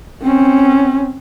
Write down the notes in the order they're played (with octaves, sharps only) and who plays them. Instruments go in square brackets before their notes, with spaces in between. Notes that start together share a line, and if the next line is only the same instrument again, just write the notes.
[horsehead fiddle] C4 C#4